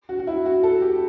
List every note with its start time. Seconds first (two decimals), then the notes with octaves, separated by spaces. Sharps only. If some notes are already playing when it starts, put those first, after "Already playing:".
0.09 F#4
0.19 F#4
0.27 E4
0.46 F#4
0.63 A4
0.81 G4